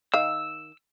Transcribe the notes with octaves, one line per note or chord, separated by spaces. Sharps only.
D#3 F5 E6